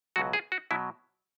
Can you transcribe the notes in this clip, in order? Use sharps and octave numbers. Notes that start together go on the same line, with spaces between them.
C#2 B2 F#3 F#4
G#4
F#4
B2 F#3 E4